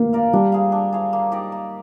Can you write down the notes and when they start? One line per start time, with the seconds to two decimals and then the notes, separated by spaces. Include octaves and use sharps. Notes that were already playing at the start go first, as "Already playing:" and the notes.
Already playing: A#3 F4
0.13 A#4 D5 F5
0.33 G3 D4
0.52 G#4 C5 F5
0.72 D4
0.93 G#4 C5 F5
1.13 A#3
1.32 D#4 G4 D5
1.52 A#3